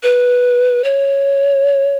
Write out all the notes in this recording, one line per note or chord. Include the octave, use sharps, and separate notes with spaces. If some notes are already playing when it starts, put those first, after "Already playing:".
B4
C#5